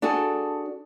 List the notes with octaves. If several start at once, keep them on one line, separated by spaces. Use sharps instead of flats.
D4 F#4 G#4 A4